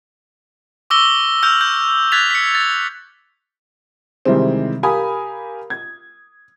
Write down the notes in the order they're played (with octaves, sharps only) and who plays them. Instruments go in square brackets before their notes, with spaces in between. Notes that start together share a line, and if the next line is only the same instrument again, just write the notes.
[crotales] C#6 D6 E6 A#6 G7
E6 F6 G6 F7
G6
F6 F#6 G#6 A6 B6 F7
B6 C#7
A6
[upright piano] C3 D#3 E3 G3 G#3 C4
G4 A#4 F5 G#5 B5 D#6
G#6